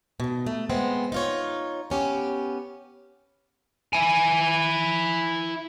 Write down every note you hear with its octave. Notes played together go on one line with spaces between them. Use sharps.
B2 D#3
A3
G#3 B3 C4
D#4 F4 C#5
B3 C#4 G4
E4 G#5